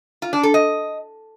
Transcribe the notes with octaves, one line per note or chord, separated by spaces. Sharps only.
F4
D4
A4
D#5